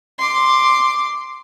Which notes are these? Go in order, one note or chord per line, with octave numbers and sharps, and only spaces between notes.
C6 D6